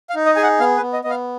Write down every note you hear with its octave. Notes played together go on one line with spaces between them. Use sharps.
F5
D#4
D#5
G#4 G#5
F#5
B3 F5
B4
B3
D#5
B3 D#5
F5